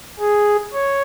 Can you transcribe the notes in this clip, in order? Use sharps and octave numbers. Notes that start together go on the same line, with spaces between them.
G#4
C#5